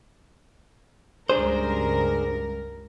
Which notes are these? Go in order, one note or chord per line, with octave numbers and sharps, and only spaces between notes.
C#2 G2 D4 G#4 A#4 C5